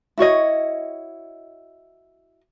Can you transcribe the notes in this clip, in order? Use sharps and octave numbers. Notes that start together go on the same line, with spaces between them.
E4 F#4 C#5 D#5